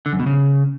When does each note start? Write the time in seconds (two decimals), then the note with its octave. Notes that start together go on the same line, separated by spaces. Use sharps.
0.06 D3
0.13 F#2
0.20 B2
0.26 C#3